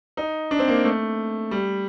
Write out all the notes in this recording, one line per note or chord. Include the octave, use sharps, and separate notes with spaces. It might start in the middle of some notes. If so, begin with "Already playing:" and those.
D#4
D4
C4
A#3
A3
G3